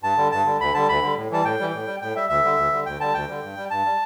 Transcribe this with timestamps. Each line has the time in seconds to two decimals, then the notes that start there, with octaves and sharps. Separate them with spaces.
0.03 G2 A5
0.17 D3 G3
0.32 G2 A5
0.45 D3 G3
0.60 D2 B5
0.74 D3 G3 A5
0.89 D2 B5
1.02 D3 G3
1.17 A2
1.30 E3 G3 A5
1.44 A2 G5
1.59 E3 G3
1.73 A2
1.87 G3
2.02 A2 G5
2.16 G3 E5
2.29 D2 E5
2.44 D3 G3
2.57 D2
2.73 D3 G3
2.86 D2 G5
3.00 D3 G3 A5
3.14 D2 G5
3.28 D3 G3
3.43 G2
3.57 G3
3.71 G2 A5
3.85 G3